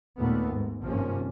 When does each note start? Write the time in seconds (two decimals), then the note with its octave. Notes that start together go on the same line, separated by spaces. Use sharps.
0.19 D#2 A#2 A3 B3
0.53 G#2
0.82 G#1 G2 C3 F3 A#3 C#4